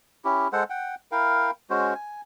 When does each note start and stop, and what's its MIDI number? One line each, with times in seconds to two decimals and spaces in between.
0.25 0.48 61
0.25 0.48 64
0.25 0.48 67
0.53 0.63 56
0.53 0.63 69
0.53 0.63 72
0.53 0.63 78
0.70 0.95 78
0.70 0.95 79
1.12 1.51 64
1.12 1.51 70
1.12 1.51 77
1.12 1.51 79
1.70 1.94 56
1.70 1.94 61
1.70 1.94 66
1.70 1.94 72
1.95 2.21 80